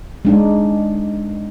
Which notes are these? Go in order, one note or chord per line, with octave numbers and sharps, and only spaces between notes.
G#3 D4 D#4